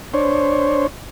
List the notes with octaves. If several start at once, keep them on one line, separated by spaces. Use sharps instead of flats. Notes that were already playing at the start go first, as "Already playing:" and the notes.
D4 C5 C#5